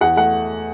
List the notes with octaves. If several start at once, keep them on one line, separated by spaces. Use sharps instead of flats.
E2 F#5
A3 F#5